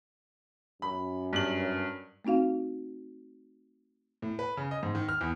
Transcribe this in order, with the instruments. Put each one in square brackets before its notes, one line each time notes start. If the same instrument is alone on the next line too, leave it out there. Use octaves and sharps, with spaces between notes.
[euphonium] F#2 [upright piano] B5
[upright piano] G2 F#7
[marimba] A3 C4 D#4 F#4 F5
[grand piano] A2
B4
C#3
D#5
G#2
D#3
F6
E2